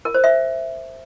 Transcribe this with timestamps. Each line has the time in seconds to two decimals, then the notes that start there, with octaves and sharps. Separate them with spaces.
0.05 A#4
0.14 C5
0.24 E5